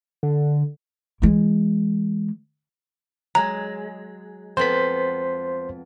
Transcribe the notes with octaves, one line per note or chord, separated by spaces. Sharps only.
D3
E3 G#3
F#3 G#3 A#5
F2 B3 C5 B6